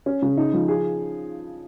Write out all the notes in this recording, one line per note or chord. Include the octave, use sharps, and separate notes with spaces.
C#4
C#3
D#4
F3
G#4